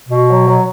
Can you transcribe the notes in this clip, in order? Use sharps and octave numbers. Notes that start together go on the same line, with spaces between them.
B2
F#3
F#3